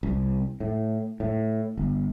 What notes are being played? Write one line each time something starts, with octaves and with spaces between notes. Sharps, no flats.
C2
A2
A2
G1